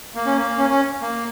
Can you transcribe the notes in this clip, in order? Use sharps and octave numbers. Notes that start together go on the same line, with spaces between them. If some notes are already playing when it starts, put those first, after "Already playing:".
A#3
C#4
A#3
C#4
C#4
A#3